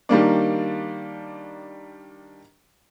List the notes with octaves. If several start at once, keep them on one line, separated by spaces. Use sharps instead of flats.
D#3 G3 A#3 D4